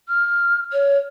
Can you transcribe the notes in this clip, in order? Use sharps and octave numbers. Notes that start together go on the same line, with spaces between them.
F6
C#5